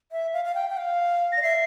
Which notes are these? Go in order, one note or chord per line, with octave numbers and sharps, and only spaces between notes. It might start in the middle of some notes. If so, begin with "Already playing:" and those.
E5
F5
F5
G5
G5
F5
D5 A#6
E5 C7